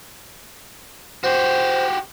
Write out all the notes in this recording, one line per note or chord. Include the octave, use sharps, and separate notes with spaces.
F#4 G4 C5